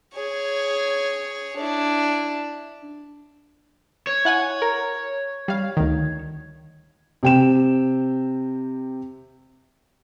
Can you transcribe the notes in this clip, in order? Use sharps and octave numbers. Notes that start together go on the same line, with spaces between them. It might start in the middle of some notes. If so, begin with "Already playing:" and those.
G#4 C#5
D4 E4
C#5
E4 F#5 G#5
A#4
G3 F5
D2 D#3
C3 G5 E7